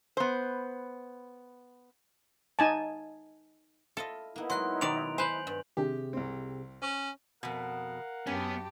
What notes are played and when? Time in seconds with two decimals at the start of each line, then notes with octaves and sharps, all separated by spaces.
0.17 B3 C5
2.59 D#4 G#5 A5
3.97 E4 F4 A4 D#5
4.36 A#3 B3 D#4 E4
4.50 F#3 G#3 C6 F#6
4.81 B2 D#3 D5 D7 F7
5.18 B4 C5 G#5 G6 F#7
5.47 G2
5.77 C3 D#3 D4 G4 G#4
6.13 C2 C4
6.82 C#4 C5 C#6
7.43 F2 B2 A#4 F5 F#5
8.27 F#2 B3 C#4 G4 A5